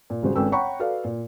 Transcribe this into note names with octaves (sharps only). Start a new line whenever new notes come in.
A#2
G#1 C#3 G3 F#4 G#4 C5
G#1 C#4 A4 B4 G5 E6
C#5 F#5 G5 A#5 B5 C#6
F#4 A4 B4 D5 F5
A#2